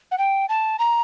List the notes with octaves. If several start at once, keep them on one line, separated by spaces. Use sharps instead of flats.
F#5
G5
A5
A#5